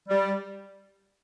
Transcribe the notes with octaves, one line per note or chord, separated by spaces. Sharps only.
G3